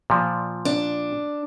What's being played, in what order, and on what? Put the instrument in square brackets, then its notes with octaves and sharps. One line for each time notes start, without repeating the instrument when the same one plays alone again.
[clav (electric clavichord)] A#2 F3
[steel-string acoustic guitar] D4